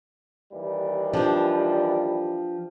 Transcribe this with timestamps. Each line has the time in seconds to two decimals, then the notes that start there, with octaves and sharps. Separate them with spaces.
0.51 D#2 E3 G3
1.13 F3 D4 G4